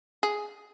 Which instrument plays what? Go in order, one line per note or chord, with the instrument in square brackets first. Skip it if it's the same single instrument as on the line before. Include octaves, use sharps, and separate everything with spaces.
[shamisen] G#4